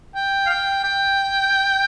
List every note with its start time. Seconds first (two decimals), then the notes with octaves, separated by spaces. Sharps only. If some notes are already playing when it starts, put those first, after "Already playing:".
0.15 G5
0.47 F5
0.50 G5
0.84 G5